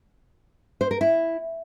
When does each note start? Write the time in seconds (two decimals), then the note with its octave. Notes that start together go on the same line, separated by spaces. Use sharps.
0.81 C5
0.91 A#4
1.01 E4